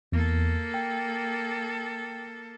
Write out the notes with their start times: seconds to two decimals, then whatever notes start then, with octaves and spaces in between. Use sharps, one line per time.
0.12 E2 A#3 A4
0.74 G5